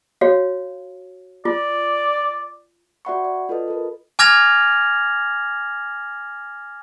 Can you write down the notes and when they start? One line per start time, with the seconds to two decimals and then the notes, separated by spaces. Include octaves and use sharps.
0.21 F#4 C#5 F5
1.45 F4 D5
3.05 F#4 D5 E5 F#5 B5 C#6
3.24 D5
3.49 F4 A4 B4 D#5
3.68 A4 A#4
4.19 G#5 D6 F6 G#6 A#6 F7